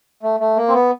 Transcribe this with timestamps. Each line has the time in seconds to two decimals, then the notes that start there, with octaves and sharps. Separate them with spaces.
0.23 A3
0.40 A3
0.57 A#3
0.68 C4
0.74 B3